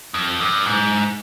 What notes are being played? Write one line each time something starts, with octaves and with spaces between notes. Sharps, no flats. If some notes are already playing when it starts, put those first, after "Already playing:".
F2
G2
G#2